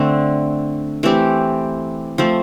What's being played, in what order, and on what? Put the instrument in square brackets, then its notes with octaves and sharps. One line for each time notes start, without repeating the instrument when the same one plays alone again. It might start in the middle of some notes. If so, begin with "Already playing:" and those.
Already playing: [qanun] D3 A3 C4
E3 A3 C4 G4
F3 A3 C4